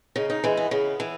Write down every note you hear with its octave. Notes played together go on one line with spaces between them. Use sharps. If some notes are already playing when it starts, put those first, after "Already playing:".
C#3 D#4
D#4
E3 G#3
B3
C#3 B3
E3